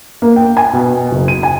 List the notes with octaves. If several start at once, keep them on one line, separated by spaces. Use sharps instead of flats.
A#3
G5
G#5
B2
F#1
D#7
G#5